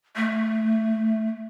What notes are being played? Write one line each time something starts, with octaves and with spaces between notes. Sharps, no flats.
A3